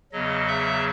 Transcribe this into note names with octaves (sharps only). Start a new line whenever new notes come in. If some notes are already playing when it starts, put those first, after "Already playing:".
E2 C#3 F#3 D#5
E5